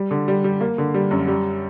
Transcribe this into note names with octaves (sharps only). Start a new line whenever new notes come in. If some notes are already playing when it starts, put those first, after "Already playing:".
Already playing: G3
D3
G3
G3
A#3
D3
G3
F#2
G3